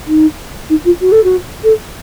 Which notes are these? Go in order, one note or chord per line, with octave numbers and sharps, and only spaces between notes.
D#4
D#4
F4
F#4
A4
F#4
A4